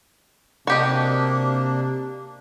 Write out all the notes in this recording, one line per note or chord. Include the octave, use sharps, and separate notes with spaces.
C3 A#3 D4 F#4 G4 D#5